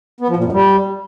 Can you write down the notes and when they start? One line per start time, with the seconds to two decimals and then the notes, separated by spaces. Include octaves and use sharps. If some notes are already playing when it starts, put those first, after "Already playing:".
0.21 B3
0.28 F3
0.36 A#2
0.44 F#2
0.52 G3